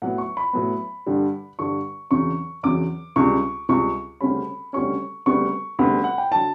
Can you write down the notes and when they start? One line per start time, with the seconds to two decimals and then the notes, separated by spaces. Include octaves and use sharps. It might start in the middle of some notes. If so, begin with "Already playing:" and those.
0.02 A2 F#3 B3 F#5
0.18 C#6
0.37 B5
0.53 A2 F#3 B3
1.06 G2 D3 G3
1.59 G2 D3 G3 C#6
2.11 E2 C#3 F#3 C#6
2.63 E2 C#3 F#3 D6
3.16 C#2 C#3 G3 C#6
3.69 C#2 C#3 G3 C#6
4.21 D2 C#3 G3 C#4 B5
4.73 D2 C#3 G3 C#4 C#6
5.26 D2 C#3 G3 B3 C#6
5.79 D2 C#3 G3 B3 B5
6.04 F#5
6.18 G5
6.32 D3 F#3 A5